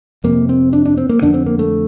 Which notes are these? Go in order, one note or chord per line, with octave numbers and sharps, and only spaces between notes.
F2 C3 A#3
C4
D4
D4
C4
A#3
F2 D3 D4
C4
A#3
A3